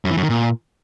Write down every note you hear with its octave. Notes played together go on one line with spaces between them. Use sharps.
F#2
E3
F#2
D#3
A#2